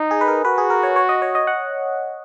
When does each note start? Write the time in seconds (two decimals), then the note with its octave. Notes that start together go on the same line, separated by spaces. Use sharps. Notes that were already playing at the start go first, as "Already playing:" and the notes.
Already playing: D#4
0.11 G#4
0.21 B4
0.28 A#4
0.45 F#4 B4
0.58 G#4
0.70 A#4
0.83 C#5
0.96 C#5
1.09 D#5
1.22 C#5
1.35 D#5
1.47 F#5